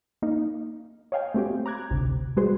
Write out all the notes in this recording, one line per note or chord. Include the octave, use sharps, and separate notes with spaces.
A#3 D#4
C#5 D#5 F5 G5 G#5
A3 C4 F#4 G4
A#5 D6 F#6 G#6
G#1 D2 C3
G3 G#3 F#4 G#4 B4 C5